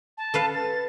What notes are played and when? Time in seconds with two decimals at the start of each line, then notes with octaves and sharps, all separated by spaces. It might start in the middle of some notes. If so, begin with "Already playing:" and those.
0.18 A5
0.34 A4 B4 F5
0.54 A6